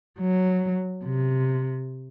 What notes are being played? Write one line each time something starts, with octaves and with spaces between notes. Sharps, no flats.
F#3
C3